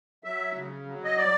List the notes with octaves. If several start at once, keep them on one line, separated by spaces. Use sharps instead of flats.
F#3 E5
C#3
F#3
D#5
D5